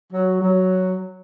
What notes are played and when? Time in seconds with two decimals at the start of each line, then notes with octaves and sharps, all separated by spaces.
0.13 F#3
0.41 F#3